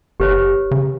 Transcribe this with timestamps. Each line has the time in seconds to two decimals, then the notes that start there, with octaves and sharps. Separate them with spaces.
0.20 F#1 G4 B4 C#5
0.71 C#3